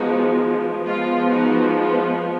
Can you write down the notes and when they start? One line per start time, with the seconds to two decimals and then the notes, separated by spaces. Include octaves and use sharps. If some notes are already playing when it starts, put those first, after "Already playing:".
Already playing: F3 G#3 B3 D#4 F#4
0.85 F3 G#3 B3 F4
1.29 D#4 F#4
1.74 F4